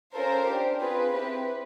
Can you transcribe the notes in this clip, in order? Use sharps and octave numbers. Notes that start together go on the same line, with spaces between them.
C#4 F4 A4 A#4 C5
D4 G4
C4 F4 G#4 B4
C4 E4 G4 B4